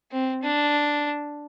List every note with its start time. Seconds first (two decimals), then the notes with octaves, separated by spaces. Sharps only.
0.11 C4
0.43 D4